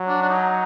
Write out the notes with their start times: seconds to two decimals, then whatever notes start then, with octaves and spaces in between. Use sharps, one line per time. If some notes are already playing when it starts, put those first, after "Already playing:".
Already playing: F#3
0.08 D4
0.22 D4
0.29 D#4